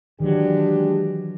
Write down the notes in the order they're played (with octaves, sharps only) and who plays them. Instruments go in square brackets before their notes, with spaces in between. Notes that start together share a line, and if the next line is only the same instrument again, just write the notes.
[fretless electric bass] D#3 E3 F#3 [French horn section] G#3 D4 G4